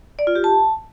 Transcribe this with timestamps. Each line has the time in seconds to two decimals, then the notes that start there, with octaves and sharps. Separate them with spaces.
0.19 D5
0.27 F4
0.36 G4
0.44 A5